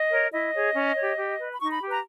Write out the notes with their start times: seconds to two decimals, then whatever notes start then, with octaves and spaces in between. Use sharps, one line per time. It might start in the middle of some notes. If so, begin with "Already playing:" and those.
Already playing: D#5
0.10 A#4 C#5
0.31 E4 D#5
0.53 G#4 C#5
0.74 C#4
0.95 G4 C#5
1.17 G4
1.38 B4
1.52 B5
1.60 D#4 C#6
1.70 B5
1.81 G4 B4
1.91 A#5